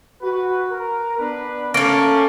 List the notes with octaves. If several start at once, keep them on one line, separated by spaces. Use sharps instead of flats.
F#4 B4
A#4
B3 D4 B4
A3 A#3 C#4